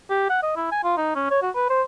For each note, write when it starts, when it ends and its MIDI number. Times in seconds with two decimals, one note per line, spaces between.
0.10 0.25 67
0.29 0.39 78
0.43 0.53 75
0.56 0.70 64
0.72 0.80 80
0.84 0.97 65
0.97 1.14 63
1.15 1.26 61
1.30 1.39 73
1.42 1.50 66
1.55 1.67 71
1.70 1.82 72